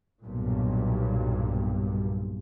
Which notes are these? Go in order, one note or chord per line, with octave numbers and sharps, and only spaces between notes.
B1 G2 A#2